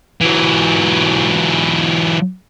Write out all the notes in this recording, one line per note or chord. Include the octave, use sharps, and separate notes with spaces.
E3 F#3